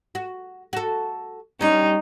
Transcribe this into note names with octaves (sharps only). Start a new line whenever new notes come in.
F#4
F#4 A4
G3 C#4 D#4